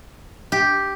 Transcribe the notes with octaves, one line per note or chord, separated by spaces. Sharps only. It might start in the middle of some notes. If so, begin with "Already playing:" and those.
G4